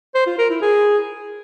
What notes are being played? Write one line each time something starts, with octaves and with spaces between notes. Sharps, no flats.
C5
F4
A#4
E4
G#4